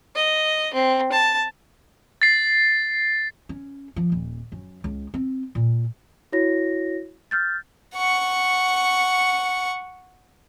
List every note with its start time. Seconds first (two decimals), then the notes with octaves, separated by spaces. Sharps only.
0.15 D#5
0.74 C4
1.12 A5
2.22 A6 C7
3.49 C#4
3.96 F3
4.12 D#1
4.52 F#2
4.84 C#2
5.14 C4
5.55 A#2
6.32 E4 F#4 C#5 A#6
7.31 F6 G6 A6
7.95 F#5 C#6